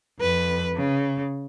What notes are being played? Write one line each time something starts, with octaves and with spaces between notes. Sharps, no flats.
F2 B4
C#3